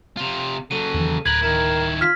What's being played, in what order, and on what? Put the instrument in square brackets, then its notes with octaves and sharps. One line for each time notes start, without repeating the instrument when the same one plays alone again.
[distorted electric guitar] C3 F4
[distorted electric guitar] C#3 F#3 [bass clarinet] A4 [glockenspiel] D#7
[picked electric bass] E2 D#3 E3
[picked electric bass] D1 [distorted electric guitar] A#4 B4 [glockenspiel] G#6 F#7
[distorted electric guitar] D#3 E4 [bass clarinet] A#4
[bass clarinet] F4 [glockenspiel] F6 B6